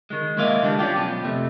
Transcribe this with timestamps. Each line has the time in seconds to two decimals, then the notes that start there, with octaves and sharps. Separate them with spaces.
0.10 D#3 G#3
0.37 G#3 A#3 E4 D#5 F5
0.62 D3 E3 G3 D4
0.79 C#4 D4 F4 G4
0.95 B1 F3 B3
1.24 F2 C3 A3